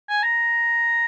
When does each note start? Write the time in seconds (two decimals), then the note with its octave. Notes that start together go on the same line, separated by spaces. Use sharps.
0.09 G#5
0.23 A#5